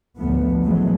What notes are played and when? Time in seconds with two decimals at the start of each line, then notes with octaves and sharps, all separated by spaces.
0.17 A1 D2 F3 A3 B3
0.62 A2 E3 F#3 G#3 A3